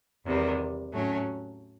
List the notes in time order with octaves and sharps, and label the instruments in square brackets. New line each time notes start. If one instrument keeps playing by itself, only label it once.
[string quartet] E2 C3 D#3 G3
A2 F#3 A3 C#4